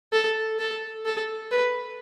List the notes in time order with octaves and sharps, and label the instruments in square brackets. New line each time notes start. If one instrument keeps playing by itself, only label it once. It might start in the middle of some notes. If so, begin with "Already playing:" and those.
[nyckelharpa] A4
A4
A4
B4